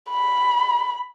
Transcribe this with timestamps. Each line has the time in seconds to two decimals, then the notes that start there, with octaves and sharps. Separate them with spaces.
0.10 B5